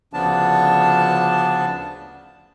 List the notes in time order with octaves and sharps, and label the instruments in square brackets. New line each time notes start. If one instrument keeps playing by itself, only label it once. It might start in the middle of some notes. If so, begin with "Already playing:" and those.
[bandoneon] D2 C#3 F3 B3 D4 A5